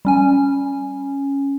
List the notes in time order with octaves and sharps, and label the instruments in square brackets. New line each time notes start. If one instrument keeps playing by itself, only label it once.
[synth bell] G3 C#4 G#5